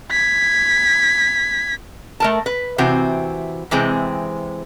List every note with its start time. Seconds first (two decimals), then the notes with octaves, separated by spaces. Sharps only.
0.10 G#6 B6
2.20 A3 A#4 A5
2.46 B4
2.78 C3 E3 C4 F#4
3.71 C3 E3 G#3 C4